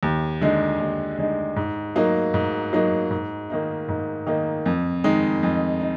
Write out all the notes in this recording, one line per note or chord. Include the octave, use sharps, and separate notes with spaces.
D#2
D3 G#3 D#4
D#2
D3 G#3 D#4
G#2
F#3 A#3 D#4
G#2
F#3 A#3 D#4
G#2
D#3 A#3 D#4
G#2
D#3 A#3 D#4
F2
D#3 G#3 D#4
F2
D#4